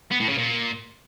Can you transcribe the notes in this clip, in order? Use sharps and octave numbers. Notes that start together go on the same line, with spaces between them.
B3
A2
C#3
A#2